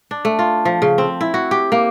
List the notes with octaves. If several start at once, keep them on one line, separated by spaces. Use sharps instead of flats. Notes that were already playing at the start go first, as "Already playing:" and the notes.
D4
A3
F4
F3
C#3
C4
E4
F#4
G4
A#3